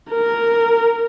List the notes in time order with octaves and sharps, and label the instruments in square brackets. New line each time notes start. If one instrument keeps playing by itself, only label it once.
[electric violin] A#4